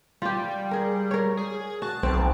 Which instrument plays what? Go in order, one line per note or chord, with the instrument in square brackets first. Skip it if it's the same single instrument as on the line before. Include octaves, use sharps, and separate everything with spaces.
[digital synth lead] G3 [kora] F4 G4
[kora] G#4 A#4
A#4 C#5
[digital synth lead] G#4
[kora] F#4 [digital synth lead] A5
[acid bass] B1 [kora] C4